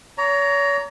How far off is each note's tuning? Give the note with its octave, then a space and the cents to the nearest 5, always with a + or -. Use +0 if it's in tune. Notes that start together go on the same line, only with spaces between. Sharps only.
C#5 +35 A#5 +0